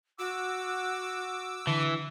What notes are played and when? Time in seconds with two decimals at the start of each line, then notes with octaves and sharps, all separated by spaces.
0.19 F#4 D6 E6
1.67 D3 E3